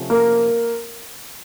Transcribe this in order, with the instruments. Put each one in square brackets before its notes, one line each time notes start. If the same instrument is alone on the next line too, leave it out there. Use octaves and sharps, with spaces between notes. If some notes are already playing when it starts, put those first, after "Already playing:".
Already playing: [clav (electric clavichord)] C3 F3 A3 C#4
[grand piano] A#3